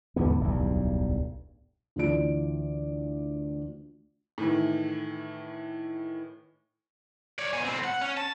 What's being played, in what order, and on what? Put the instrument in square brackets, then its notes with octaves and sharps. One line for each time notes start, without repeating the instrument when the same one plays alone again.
[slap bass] D#2 G#2 D3 B3
D1 B1 E2 G2
[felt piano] D2 E3 F4 D5 D7
[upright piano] A2 D#3 E3
[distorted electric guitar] C#5 D5
B2 G#5
A2 C4
F#5
C#4
A5